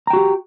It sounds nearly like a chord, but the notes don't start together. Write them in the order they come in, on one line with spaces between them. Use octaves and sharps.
A#5 G5 F#4 G4